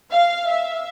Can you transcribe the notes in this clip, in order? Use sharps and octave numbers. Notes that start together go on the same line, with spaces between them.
F5
E5